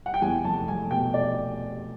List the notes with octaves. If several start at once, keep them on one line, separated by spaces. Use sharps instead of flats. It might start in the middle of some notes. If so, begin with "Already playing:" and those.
F#5
G5
E2 G#5
F1 A5
F1 G#5
B2 G5
D5